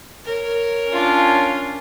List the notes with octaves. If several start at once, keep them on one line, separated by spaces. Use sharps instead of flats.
A#4 C#5
C#4 D4 F4